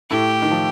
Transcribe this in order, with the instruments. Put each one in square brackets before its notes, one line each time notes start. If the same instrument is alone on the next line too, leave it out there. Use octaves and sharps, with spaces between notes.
[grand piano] A2 A3 [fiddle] G4
[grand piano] D#3
F3